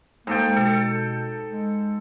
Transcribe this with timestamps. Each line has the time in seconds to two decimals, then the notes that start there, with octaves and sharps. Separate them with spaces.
0.27 G#2 A#3 A4 G5
0.56 B2 A4
1.51 G#3